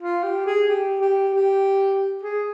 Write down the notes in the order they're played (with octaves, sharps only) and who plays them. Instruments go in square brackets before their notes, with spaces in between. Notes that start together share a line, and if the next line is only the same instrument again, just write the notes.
[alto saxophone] F4
G4
G#4
G4
G4
G4
G#4